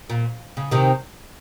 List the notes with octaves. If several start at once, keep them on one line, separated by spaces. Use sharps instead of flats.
A#2
C#3
C3 D#3